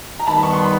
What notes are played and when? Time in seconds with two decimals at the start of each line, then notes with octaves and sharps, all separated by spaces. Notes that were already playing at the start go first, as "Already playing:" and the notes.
0.20 A#5
0.27 D#3 G3 B3 A5 B5
0.43 C#6
0.53 C6
0.63 B5